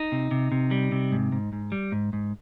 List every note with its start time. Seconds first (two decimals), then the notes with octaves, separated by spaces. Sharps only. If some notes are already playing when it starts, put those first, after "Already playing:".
Already playing: D#4
0.12 C3
0.31 C3
0.52 C3
0.71 G3
0.92 C3
1.12 G#2
1.32 G#2
1.53 G#2
1.72 G3
1.92 G#2
2.13 G#2